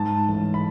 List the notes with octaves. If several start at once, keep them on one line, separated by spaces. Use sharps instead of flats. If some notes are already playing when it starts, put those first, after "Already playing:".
Already playing: G#2 A5
A1
B5